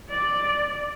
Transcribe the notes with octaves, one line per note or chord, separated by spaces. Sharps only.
D5